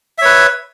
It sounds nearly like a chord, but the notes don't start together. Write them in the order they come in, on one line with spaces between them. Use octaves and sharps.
E5 C#5 B4